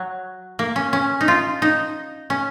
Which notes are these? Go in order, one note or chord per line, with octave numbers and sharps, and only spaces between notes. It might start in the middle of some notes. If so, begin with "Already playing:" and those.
Already playing: F#3
A#3
C#4
C#4
D#4
F4
D#4
C#4